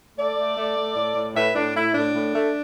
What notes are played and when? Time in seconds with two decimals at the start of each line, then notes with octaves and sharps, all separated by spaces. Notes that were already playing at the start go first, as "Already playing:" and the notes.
0.17 A3 A4 D5
0.37 A3
0.57 A3
0.76 A3
0.95 A2
1.16 A2
1.36 A2 B4 E5
1.55 A2 D4
1.74 A2 E4
1.94 A2 D4
2.14 A2
2.34 A3